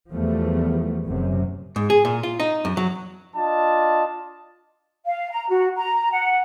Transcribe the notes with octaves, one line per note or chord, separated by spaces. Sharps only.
E2 F3 G3 A3
F#1 F#2 C3
G#2
G#4
A#2
F4
D#4
F#2
F#3
D4 F4 D#5 A5
F5
A#5
F#4
A#5
F#5